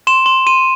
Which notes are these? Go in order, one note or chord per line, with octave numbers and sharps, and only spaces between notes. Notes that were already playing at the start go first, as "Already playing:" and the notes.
C6 E7
C6
C6 D#7